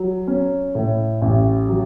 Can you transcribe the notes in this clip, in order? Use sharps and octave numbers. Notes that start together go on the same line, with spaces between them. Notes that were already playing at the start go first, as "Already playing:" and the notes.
Already playing: F#3
C#4
A2
A1
F#3